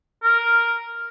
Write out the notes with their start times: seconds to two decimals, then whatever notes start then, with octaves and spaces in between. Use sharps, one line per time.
0.24 A#4